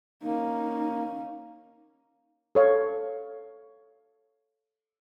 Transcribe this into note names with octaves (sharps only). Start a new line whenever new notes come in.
A#3 C#4 D#4
A4 C#5 F5